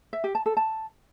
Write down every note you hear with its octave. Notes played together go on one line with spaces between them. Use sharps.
E5
G4
A5
A4
A5